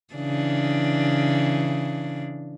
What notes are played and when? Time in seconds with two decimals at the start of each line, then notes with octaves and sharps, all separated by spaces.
0.15 C#3 E3 D4